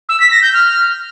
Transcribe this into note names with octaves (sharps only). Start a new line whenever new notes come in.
E6
B6
A#6
G6
F6